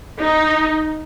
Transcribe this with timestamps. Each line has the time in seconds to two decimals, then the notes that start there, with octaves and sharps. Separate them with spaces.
0.18 D#4